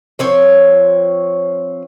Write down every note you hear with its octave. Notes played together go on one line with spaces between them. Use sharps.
F3 C4 C#5